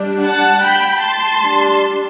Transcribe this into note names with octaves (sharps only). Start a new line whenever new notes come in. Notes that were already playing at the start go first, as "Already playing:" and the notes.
Already playing: G3 D4
F#5 A5
G5 B5
A5 C6
G3 D4